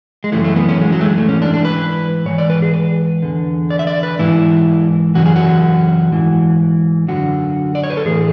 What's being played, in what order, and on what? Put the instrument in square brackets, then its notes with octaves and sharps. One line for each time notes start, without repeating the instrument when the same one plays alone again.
[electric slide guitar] G#3
F#2 C#3 E3 A3
A3
B3
C#4
G#3
F#3
A3
G#3
A3
G#2 E3 C#4
D4
D4
B4
G#2 E3 C#5
D5
B4
G#4
B4
E2 D3
D5
E5
D5
B4
G#2 E3 E4
F#2 C#3 E3 F#4
G#4
F#4
G#2 E3
F#2 D3 F#4
D5
C#5
B4
A4
A2 E3 G#4